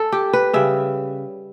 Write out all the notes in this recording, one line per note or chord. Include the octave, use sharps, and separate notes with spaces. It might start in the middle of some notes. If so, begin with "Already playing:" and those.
Already playing: A4
G4
B4
C#3 G3 E5